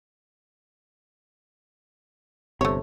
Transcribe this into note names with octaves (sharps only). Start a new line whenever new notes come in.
G1 C3 A3 C#5